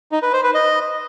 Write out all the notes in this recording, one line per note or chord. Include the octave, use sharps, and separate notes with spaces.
D#4
B4
C5
B4
D#5